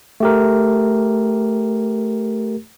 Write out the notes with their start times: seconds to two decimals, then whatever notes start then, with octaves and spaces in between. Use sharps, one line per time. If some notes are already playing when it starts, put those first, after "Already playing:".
0.20 A3 G4 A#4